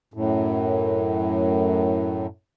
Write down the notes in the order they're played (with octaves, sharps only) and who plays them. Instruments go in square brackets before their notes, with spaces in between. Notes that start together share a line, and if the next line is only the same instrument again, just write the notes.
[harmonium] F#2 A2